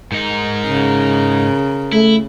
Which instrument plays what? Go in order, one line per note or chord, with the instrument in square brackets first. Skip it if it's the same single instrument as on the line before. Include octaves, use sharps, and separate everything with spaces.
[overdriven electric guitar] G#2 D#4 [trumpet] A#4
[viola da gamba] C#3
[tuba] A3 [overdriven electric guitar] E4